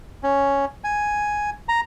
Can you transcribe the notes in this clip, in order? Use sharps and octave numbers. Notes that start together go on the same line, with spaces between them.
C#4
G#5
A#5